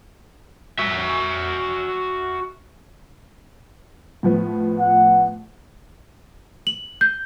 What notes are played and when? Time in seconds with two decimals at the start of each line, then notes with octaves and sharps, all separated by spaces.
0.79 F#4 E5
4.23 A2 F3 B3
4.79 F#5
6.67 F#7
7.01 G6